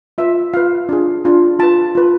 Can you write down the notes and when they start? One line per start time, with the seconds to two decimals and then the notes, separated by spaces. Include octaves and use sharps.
0.18 F4 B4 E5
0.54 F4 B4 F5
0.89 D4 F4 G#4
1.24 D4 F4 G#4
1.59 F4 B4 A5
1.95 F4 B4